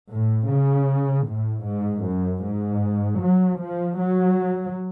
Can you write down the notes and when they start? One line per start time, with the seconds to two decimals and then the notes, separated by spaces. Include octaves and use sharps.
0.11 A2
0.50 C#3
1.27 A2
1.66 G#2
2.05 F#2
2.45 G#2
3.21 F#3
3.61 F3
4.00 F#3